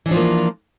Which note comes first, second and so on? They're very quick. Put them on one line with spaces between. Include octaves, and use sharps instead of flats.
E3 D4 F3 F4 A#3